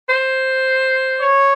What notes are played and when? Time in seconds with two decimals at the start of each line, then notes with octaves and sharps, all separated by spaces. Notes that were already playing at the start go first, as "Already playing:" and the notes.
0.09 C5
1.20 C#5